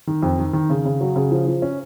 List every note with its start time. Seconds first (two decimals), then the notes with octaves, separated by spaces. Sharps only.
0.07 D#3
0.23 F2
0.38 D#3
0.53 D#3
0.70 C#3
0.85 C#3
1.01 F#3
1.16 C#3
1.31 F3
1.47 F3
1.62 C#4